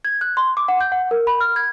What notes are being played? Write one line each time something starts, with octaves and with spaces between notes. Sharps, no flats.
G#6
F#6
C6
D6
F#5
G6
F#5
A#4
B5
F6
G#6